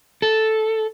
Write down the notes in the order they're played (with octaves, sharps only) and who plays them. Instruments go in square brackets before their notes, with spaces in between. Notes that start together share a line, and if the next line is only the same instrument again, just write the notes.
[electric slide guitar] A4